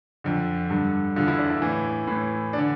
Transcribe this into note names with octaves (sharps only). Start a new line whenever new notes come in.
F2 D3
G2 D3
E2 D3 F4
E4
D4
E4
A2 E3
A2 E3
D4
D3